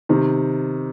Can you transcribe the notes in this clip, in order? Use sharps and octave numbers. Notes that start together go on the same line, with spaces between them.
C3 D#3